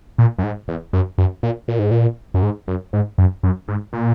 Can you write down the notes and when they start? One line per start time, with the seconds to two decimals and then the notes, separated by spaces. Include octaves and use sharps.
0.18 A#2
0.39 F#2
0.44 G#2
0.68 E2
0.93 F#2
1.18 F#2
1.43 A#2
1.68 A#2
1.79 G#2
1.91 A#2
2.34 F#2
2.43 G#2
2.68 F#2
2.93 G#2
3.18 F#2
3.43 F#2
3.68 G#2
3.93 A#2